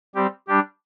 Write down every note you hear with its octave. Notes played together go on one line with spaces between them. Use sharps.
G3 C4 G4
G3 D4 G4